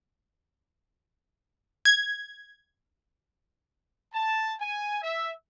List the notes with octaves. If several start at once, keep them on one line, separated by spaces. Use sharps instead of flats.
G#6
A5
G#5
E5